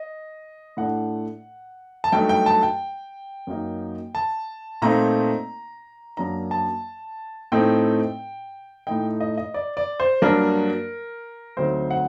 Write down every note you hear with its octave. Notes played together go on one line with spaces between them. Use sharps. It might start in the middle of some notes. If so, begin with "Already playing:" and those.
Already playing: D#5
A2 A3 D4 F#5
A5
G2 F#3 A3 D#4 G5
G5
A5
G5
F#2 F#3 A#3 D#4
A5
A#2 A3 C4 D#4 A#5
F#2 F#3 A#3 D4 A#5
A5
A2 A3 C4 D#4 G5
A2 A3 D#4 G5
D#5
D#5
D5
D5
C5
G2 F#3 A#3 D4 A#4
D2 D3 F#3 C4 D#4 C5
F#5